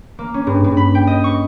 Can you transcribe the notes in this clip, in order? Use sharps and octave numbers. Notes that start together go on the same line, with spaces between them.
A#3
C#4
G2
G2
B5
G5
D#5
C#6